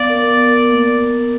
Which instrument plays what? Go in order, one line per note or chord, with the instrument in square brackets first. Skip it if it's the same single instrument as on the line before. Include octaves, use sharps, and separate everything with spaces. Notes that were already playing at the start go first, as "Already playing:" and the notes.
Already playing: [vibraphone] B3 F5 [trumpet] D5
[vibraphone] A#4
B3
A#4
A#3